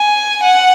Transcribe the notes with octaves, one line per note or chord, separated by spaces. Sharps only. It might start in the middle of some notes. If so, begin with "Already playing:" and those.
Already playing: G#5
F#5